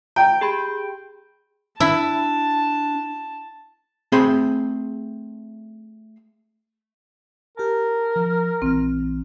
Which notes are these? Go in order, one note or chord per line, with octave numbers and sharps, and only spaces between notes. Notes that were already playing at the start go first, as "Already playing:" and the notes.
G5 A#5
G4 G#4 B5
D4 E4 A5
A3 C4 G#4 B5 C6
G4 A#4 A5
F3
A#1 E3 C4 F6